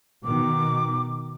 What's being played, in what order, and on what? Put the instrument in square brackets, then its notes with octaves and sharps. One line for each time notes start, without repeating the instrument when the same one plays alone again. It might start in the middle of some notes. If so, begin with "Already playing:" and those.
[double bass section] B2 D#3 [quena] D6